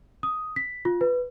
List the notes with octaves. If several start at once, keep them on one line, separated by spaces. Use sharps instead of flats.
D#6
B6
F4
B4